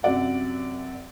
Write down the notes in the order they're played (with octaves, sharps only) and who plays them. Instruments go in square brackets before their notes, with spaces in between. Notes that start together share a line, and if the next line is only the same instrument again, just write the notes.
[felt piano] F#2 C3 F#3 D5 F#5